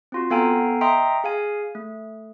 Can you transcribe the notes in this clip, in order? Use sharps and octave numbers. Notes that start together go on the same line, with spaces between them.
C4 F4 F#4
B3 A4 F5 G5 G#5 A#5
D#5 E5 G5 A#5 C6 D#6
G#4 F5 G#5
A3